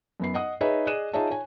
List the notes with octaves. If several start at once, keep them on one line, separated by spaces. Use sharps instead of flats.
F#2 B3 C7
D#5 F#5 D#6
D#4 G#4 B4 C#5 D#5 E5
G#4 D5 D#5 F#6 D#7 E7
D#4 F4 G#4 C#5 E5 A5
C#5 G#5